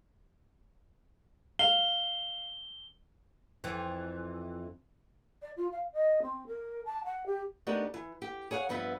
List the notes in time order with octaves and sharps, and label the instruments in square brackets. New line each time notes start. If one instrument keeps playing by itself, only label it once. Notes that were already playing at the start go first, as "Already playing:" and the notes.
[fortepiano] F5 [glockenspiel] G7
[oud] F2 E3
[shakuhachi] D5
F4
F5
D#5
C4
A#4
A5
F#5
G4
[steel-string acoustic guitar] A3 B3 D4 D#4 G4 A#4
E3
G4
G#4 C#5 F5 F#5
G2 F3 B3 E4 B4